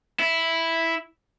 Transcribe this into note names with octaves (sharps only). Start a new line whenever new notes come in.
E4